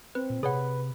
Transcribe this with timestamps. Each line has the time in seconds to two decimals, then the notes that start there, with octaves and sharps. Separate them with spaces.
0.15 C4 B4
0.30 A#2
0.43 C3 G#4 B4 C#5 F#5